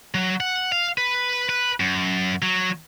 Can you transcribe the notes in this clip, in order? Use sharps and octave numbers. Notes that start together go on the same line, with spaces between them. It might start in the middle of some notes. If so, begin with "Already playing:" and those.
F#3
F#5
F5
B4
B4
F#2
F#3